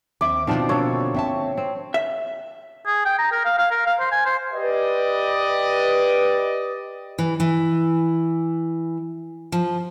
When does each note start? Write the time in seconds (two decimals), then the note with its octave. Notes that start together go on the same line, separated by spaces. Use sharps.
0.21 D#2 C4 E5 D6
0.47 B2 D#3 F3 C4 D4
0.69 D3 A#3 A4 C#5
1.15 C4 E5 A5
1.57 C4
1.94 E5
2.86 G#4
3.05 G5
3.18 A#5
3.32 A#4
3.45 F5
3.59 F5
3.71 A#4
3.87 F5
4.00 C5
4.12 G#5
4.26 C5
4.53 G4 B4 D5 D#5
7.18 E3
7.40 E3
9.52 F3